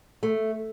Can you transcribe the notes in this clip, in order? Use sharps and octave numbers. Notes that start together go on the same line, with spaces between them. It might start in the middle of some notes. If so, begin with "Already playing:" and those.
A3